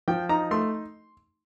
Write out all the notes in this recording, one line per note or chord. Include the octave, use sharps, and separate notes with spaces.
F3 G5
D#4 A#5
A3 C6